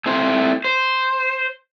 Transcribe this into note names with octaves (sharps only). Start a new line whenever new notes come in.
A3 C4 E4 C5
C5